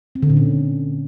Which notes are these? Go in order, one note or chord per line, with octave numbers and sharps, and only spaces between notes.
C4
D3
A#2
C#4